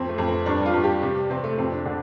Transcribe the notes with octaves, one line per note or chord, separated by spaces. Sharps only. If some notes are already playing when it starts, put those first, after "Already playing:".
Already playing: F2 C4
A3
F2
C4
G2 D4
F4
G2
G4
C3 G3
C3 C4
A3
F2 C4
D4
D3 D4